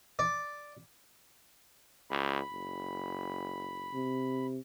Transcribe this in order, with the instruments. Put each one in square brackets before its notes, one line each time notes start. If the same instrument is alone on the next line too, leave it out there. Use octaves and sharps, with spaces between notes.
[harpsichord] D5
[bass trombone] C#2 [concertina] B5
[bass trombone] F#1
[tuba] C3